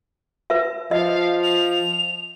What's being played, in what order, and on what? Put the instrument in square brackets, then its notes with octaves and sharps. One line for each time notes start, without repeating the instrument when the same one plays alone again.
[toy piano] B4 E5
[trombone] F3 [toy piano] D#5 [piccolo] F5
[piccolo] F7